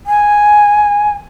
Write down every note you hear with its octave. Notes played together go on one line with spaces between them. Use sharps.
G#5